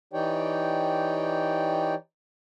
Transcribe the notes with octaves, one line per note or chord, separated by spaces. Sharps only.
E3 D#4 G4 C#5 D5 G5